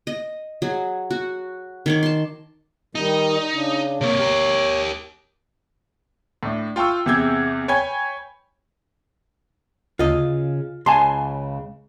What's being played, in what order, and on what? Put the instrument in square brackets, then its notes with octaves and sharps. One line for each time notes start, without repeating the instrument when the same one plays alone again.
[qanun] D#5
F#3 G#4
F#4
D#3 C#5 D6
A5 C6
[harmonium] D#3 G3 [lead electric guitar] D#4
[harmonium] C#3 D4
[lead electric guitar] C3 A#3 [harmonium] C#5
[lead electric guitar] G4 A#4
[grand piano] A2 D4
F4 G5 A5 C#6 E6
E2 C3 G#4 E6 G6 G#6
C#5 G5 G#5 B5 G#6
[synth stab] D2 [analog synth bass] C#3 [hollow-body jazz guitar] F4 D#5
[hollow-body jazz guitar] C#2 [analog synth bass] C#3 [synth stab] G#5 A5 C6